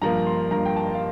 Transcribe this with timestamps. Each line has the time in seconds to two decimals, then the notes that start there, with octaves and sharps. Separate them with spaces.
0.01 G2 F3 A#3 A#5
0.27 C6
0.51 G2 F3 A#3 A#5
0.65 G5
0.76 A5
0.95 F5